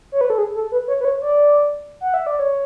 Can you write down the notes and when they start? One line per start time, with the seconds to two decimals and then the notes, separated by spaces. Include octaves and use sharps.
0.12 C#5
0.21 B4
0.30 A4
0.38 G#4
0.55 A4
0.72 B4
0.88 C#5
1.01 B4
1.05 C#5
1.22 D5
2.01 F#5
2.14 E5
2.26 D5
2.39 C#5